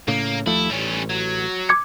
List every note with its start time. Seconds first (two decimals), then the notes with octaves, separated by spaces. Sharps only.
0.08 A2 C#3 A#3
0.46 D#2 F3 A3 E4
0.70 A1 G3 C#4
1.10 F#3
1.69 D6 G#6 C#7